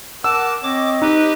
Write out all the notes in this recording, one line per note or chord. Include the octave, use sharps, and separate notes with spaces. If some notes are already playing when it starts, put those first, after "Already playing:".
A#4 F#5 A5 D6 E6
C4 C#5 D#5 D6
D#4 G4 B4